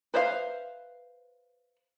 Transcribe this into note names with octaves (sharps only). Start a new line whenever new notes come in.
B4 C5 E5 F5